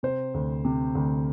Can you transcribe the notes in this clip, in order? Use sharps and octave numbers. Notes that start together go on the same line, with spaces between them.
C3 C5
D2
C3
D2